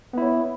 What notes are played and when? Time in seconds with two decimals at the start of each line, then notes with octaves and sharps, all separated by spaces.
0.13 B3
0.18 E4
0.22 C#5